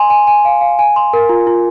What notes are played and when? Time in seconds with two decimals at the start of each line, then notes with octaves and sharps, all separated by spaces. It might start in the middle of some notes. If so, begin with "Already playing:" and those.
Already playing: G#5 C6
0.10 G#5
0.27 G#5
0.45 F5
0.61 F5
0.79 G#5
0.96 C6
1.14 A#4
1.29 F4
1.47 F4